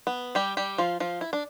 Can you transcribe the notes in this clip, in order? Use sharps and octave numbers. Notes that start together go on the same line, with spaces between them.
B3
G3 G4
G3 G4
F3 F4
F3 F4
E4
D4